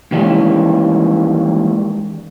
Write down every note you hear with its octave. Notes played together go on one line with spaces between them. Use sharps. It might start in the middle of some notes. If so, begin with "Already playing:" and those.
D#3 E3 G3 G#3 A#3 C#4